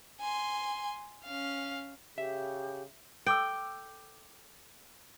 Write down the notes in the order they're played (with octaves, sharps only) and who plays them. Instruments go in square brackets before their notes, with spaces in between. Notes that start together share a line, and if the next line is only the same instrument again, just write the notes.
[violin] G#5 C6
C#4 F5
[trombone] C#3 [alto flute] G4 [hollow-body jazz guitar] E5
[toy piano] A4 D6 E6 [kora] G5